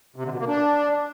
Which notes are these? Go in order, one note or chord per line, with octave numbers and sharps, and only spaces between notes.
C3
D3
B2
A#3
D4